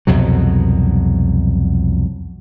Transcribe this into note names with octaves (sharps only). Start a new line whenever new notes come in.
C2 F2 B2 F#3